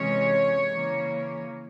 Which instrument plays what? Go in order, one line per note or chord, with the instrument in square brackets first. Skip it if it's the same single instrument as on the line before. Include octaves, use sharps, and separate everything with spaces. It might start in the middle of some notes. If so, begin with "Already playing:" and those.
Already playing: [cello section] C3 E3 G#3 C#4 C#5
C#3 E3 A#3 C#4